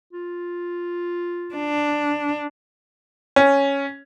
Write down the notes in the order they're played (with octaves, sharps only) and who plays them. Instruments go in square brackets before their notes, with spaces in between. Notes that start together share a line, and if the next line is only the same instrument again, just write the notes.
[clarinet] F4
[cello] D4
[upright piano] C#4